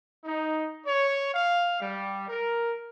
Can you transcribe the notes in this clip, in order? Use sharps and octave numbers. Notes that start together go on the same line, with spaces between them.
D#4
C#5
F5
G3
A#4